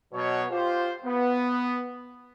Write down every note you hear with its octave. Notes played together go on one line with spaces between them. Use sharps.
B2 F#3 B3 C#5
F4 G4 C5
B3